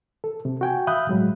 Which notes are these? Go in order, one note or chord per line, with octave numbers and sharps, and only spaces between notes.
A4
C3
F#4 G5 G#5
E5 F5 B5 D#6 F#6 G6
A2 F#3 G#3